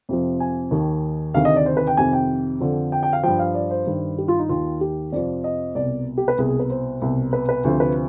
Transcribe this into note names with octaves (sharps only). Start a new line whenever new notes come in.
F2 C3 F3
G#5
D#2 D#3
D2 C3 D#3 F5
D#5
D5
C5
B4
G5
F2 C3 D#3 G#5
G5
F2 D3 F3
G5
G5
F5
G2 F3 G5
F5
D5
C5
G2 D#3
G4
F4
D#4
D#2 D#3 F4
G4
F2 C3 F3 D5
D#5
C2 B2 D5
G4
B4
C2 B2 G#4
G#4
B4
C5
C2 B2
B4
B4
D2 C3 F3 C5
B4